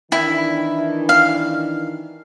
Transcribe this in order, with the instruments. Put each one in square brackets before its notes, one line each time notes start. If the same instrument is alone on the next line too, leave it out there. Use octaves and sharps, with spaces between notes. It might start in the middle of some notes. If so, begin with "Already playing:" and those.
[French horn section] D#3 E3 D4 [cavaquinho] E4
[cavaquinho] F5